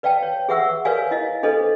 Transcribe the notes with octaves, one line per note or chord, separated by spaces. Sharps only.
B4 D5 F5 G5 A5
C#5
G#4 B4 E5 F#5 C#6 E6
A#4 B4 C#5 D5 F5 G#5
E4 D#5 F5
D4 G#4 A4 B4 C5 D#5